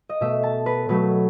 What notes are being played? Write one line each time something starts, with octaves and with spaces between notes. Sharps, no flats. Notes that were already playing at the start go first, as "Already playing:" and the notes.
D#5
B2 A3 E5
A5
B4
B2 F#3 A3 B4